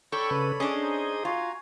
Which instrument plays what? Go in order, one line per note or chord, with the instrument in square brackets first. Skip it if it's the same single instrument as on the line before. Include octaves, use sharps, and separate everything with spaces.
[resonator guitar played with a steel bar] A4 [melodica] C#5 D5 B5 [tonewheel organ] G5 C#6
[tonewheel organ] C#3 B4
[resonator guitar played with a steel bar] C#4 D4 [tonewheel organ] G#4 D#5
[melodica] D#4 C5
[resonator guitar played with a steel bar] F4 [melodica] F#4 G#5 A#5